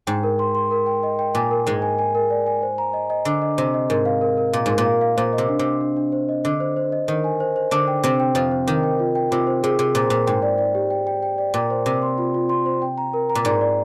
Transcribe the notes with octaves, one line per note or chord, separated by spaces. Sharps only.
G#2 G5
A#4
C6
C6
A#4
G5
D#5
G5
A#2 G#5
A#4
G#2 G#3 A#4
G#5
G#5
A#4
D5
G#5
C5
A#5
D#5
D#5
D3 D6
D#5
C3 C5
D#5
G#2 A#4
F5
A#4
A#4
A#2 F5
G#2 A#4
A#2
F5
F5
A#2 C5
D#5
C3
D4
C3
D4
D4
D4
C5
D#5
D3 D#5
C5
C5
D#5
D#3 D#5
G#5
C5
C5
D3 D4 C5
G5
C3 C4 C5
G5
F2 F3 C5
C5
D#3 D6
G5
F4
G5
C3 F4
C5
C3 G#4
C3 G#4
A#2 C5
A#2 C5
G#2 G5
D5
D5
G4
G5
G5
G5
D5
A#2 G5
C5
C3 C5
C6
F4
F4
C6
C5
G5
A#5
A#4
A#5
A#2
G#2 D5
D5